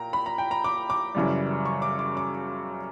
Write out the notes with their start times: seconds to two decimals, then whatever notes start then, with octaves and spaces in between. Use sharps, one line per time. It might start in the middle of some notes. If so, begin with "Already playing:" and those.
Already playing: A#2 G5 A#5
0.13 B5
0.26 A#5
0.38 G5
0.51 A#5
0.64 D6
0.90 D6
1.15 F#2 C#3 E3 G3
1.65 C#6
1.82 D6
1.99 D6
2.17 D6